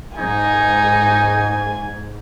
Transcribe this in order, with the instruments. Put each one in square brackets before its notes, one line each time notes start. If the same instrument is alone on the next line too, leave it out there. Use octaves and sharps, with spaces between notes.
[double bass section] G#2 [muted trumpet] D#4 [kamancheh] G#5 [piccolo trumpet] G#6